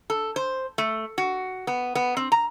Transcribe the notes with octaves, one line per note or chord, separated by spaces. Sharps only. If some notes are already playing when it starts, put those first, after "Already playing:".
A4
C5
A3
F#4
B3
B3
C4
A#5